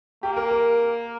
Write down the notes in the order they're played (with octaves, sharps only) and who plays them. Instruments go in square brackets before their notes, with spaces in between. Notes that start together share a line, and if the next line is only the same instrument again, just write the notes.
[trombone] A#3 [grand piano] G4
[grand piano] A#4
A#4